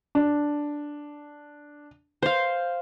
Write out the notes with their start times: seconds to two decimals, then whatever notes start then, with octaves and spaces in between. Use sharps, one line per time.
0.15 D4
2.22 C5 F5